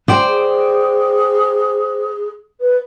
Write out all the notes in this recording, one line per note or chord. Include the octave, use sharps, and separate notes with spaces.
C5 D5 G5
G#4
B4